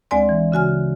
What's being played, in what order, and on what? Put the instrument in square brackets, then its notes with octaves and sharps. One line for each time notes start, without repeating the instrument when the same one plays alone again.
[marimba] D2 G#3 C4 D5 G#5 C6
E3
C#3 F#4 G#5 F6